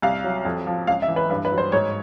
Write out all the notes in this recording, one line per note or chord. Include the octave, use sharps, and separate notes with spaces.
C2 F5
F#3
F2
F3
C#2 F5
E5
E3
B4
G2 B4
B4
F#3
C5
G#2 C#5